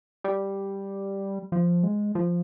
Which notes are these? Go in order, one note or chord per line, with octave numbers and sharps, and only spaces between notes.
G3
F3
G#3
F3